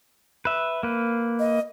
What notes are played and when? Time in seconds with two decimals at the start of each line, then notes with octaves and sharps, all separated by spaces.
0.45 B4 E5
0.83 A#3 B4
1.39 D#5